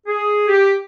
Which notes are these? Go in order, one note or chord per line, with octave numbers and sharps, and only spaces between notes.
G#4
G4